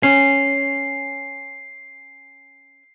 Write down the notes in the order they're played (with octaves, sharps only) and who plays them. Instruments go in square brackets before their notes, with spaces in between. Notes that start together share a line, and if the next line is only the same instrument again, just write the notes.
[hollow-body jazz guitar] C#4 [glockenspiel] C7